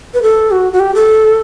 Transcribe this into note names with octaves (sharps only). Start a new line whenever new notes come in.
B4
A4
F#4
F#4
G4
A4